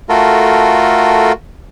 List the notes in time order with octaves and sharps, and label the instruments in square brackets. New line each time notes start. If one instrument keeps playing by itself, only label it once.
[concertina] A3 F4 F#4 A4 A#4